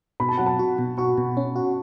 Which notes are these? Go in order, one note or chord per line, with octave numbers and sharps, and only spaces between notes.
B2 B5
A5
F#3 F#5
A5
F#4
B2
F#4 C#6
B2
C#4
F#4